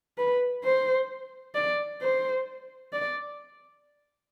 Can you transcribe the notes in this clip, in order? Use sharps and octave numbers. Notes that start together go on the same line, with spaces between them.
B4
C5
D5
C5
D5